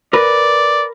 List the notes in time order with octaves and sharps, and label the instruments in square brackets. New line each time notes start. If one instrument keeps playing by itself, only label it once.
[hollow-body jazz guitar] A#4 B4 [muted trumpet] D5